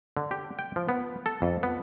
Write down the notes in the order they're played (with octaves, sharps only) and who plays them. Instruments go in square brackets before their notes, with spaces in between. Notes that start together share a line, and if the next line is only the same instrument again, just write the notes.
[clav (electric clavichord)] D3
G4
G5
F3
B3
A4
F2
B3